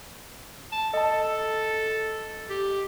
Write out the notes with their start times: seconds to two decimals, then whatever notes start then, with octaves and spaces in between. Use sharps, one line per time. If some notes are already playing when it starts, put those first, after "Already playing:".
0.72 A5
0.94 A4 D#5 A5
2.50 G4